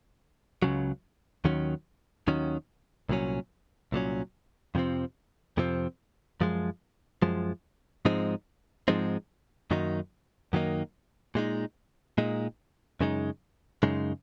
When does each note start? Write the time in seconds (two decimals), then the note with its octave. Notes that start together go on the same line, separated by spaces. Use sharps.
0.62 C#2 C#3 F#3
1.45 D#2 D#3 F#3 C#4
2.27 D#2 D#3 F#3 C#4
3.09 C2 A#2 F#3 C#4
3.92 C2 A#2 F#3 C#4
4.75 F2 C3 F3 C4
5.57 F2 C3 F3 C4
6.41 F#2 F3 G#3
7.22 F#2 F3 G#3
8.05 G#2 F3 G#3 C4 D#4
8.88 G#2 F3 G#3 C4 D#4
9.71 F#2 D#3 F#3 A#3 D#4
10.53 F#2 D#3 F#3 A#3 D#4
11.35 A#2 G#3 D#4
12.18 A#2 G#3 D#4
13.01 F#2 C#3 G#3 D#4
13.83 F#2 C#3 G#3 D#4